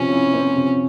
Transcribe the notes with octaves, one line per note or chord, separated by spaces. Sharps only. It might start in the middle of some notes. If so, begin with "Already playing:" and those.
Already playing: C3 F3 C4 C#4
E4
C4
C3